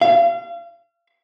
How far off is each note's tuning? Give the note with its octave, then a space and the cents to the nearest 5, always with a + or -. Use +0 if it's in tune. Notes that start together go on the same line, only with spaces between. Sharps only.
F5 -35